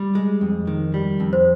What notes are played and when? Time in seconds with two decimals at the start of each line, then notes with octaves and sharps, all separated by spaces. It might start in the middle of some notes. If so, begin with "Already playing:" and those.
Already playing: G3
0.15 G#3
0.41 F2
0.67 D#3
0.94 G3
1.20 F2
1.33 C5